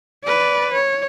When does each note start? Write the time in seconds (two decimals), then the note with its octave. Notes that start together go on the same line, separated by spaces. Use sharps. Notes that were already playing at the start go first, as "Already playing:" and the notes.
0.24 B4 D5
0.72 C#5